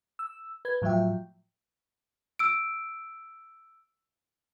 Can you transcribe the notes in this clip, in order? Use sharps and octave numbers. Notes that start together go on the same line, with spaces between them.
E6
B4 G#6
A2 F3 F#3 E5 G5
E6 D7